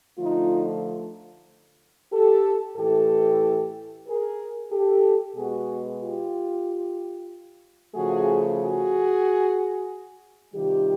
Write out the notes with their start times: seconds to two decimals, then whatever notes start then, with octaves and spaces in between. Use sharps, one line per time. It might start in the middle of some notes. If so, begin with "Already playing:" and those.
0.18 D3 F3 A3 D#4 F4
2.12 G4 A4
2.77 A2 E3 A3 G4 A4
4.07 G#4 A#4
4.71 G4 A4
5.36 B2 G#3 B3 F#4 G#4
6.02 F4 G4
7.95 C#3 F3 A3 F#4 G#4
8.61 F#4 G#4
10.54 C3 D#3 G3 F4 G4